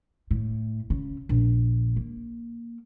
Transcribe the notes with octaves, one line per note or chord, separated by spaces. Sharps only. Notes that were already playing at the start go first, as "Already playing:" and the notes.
A2
C#3
A#1
A#3